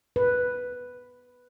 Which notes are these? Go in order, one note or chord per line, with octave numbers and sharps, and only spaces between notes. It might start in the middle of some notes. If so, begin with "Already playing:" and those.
B4